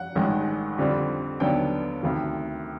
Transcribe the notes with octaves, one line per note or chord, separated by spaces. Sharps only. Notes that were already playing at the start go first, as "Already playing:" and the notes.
Already playing: F#5
A1 G2 D#3 G#3
F2 D3 G3 C4
D#2 D3 F#3 B3 D4 G5
D2 C3 D#3